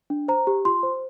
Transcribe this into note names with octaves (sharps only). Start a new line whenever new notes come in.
D4
C5 A#5
G4
F4 C6
C5